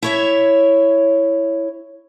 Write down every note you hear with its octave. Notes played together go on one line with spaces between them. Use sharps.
E4 C#5 E5